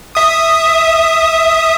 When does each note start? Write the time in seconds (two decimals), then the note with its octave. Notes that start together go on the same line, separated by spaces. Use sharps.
0.15 E5 D#6